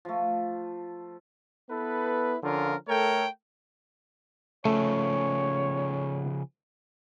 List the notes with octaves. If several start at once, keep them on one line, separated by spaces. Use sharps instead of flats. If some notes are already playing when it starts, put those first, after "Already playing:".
F3 A3
B3 E4 A4 B4
D3 F3 C#4 F4 A#4
A3 A4 A#4 C#5 G5
C#3 F3 A3 C#5